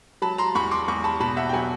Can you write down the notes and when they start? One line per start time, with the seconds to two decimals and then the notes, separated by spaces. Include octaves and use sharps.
0.22 F#3 A5 B5
0.38 A#5 C6
0.55 E2 B5 C#6
0.71 C6 D6
0.88 E2 B5 C#6
1.04 A5 B5
1.20 B2 A5 B5
1.37 E5 F#5
1.49 G5
1.53 F#3 F#5 G#5